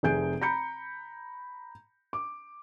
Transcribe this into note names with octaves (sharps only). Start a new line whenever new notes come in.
F1 C3 G#4 G6 D7
A#5 B5 G6 C#7
D6